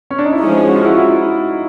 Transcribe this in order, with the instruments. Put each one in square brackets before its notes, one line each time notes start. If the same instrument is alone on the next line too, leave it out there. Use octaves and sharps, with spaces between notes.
[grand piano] C#4
D4
D#4
E4
[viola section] F3 G#3 C#4 [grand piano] D#4 F4
[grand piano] F#4
F4
E4 F#4
E4 F#4